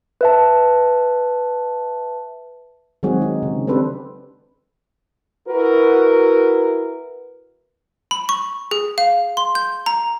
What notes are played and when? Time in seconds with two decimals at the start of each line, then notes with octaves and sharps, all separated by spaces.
0.21 B4 E5 A5
3.03 D#3 F#3 G#3 C4 F#4 G#4
3.22 D#4
3.43 C#3
3.67 C4 D4 G4 A4 B4 C5
5.49 E4 F#4 A#4 B4
8.11 B5
8.29 C#6
8.71 G#4
8.98 F5
9.37 C6
9.55 G6
9.86 A#5